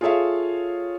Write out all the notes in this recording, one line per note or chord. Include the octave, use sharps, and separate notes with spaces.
F4 G#4 A4 C#5 E5 F5